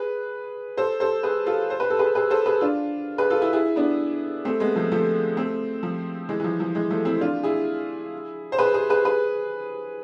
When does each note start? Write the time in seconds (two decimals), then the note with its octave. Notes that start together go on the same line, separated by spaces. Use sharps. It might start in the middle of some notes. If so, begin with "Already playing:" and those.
Already playing: G#4 B4
0.77 A4 C5
1.00 A4 C5
1.23 G#4 B4
1.46 F4 A4
1.70 C5
1.80 B4
1.90 A4
1.99 G#4 B4
2.15 G#4 B4
2.30 A4 C5
2.46 G#4 B4
2.61 D4 F4
3.18 G#4 B4
3.30 F4 A4
3.42 E4 G#4
3.53 E4 G#4
3.76 B3 D4
4.45 A3 C4
4.60 G#3 B3
4.76 F3 A3
4.92 F3 A3
5.37 A3 C4
5.83 F3
6.29 E3 G#3
6.40 E3
6.44 F3
6.60 F3
6.75 E3 G#3
6.90 F3 A3
7.05 C4 E4
7.21 D4 F4
7.43 E4 G#4
8.52 C5
8.59 G#4 B4
8.74 G#4 B4
8.89 G#4 B4
9.05 G#4 B4